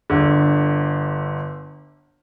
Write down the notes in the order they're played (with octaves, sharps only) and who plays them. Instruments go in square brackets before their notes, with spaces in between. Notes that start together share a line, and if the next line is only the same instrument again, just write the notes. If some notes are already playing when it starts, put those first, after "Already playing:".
[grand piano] G1 D3